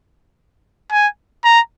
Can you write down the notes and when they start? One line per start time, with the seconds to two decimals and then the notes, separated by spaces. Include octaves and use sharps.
0.92 G#5
1.44 A#5